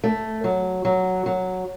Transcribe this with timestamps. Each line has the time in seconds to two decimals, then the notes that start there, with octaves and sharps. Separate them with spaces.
0.04 A3
0.44 F#3
0.85 F#3
1.26 F#3